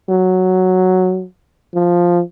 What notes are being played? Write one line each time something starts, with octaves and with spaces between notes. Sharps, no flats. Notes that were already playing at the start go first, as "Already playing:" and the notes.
F#3
F3